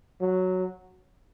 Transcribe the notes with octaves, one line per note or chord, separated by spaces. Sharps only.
F#3